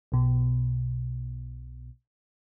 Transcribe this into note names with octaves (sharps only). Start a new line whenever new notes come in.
B1 B2